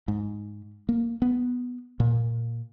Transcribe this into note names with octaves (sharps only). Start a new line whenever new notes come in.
G#2
A#3
B3
A#2